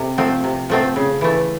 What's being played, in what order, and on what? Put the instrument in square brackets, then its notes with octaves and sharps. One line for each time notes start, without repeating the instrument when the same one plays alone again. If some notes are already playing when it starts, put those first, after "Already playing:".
Already playing: [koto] C3 A4
F3 A3 C4
C3
F3 A3 C4
C#3
E3 A3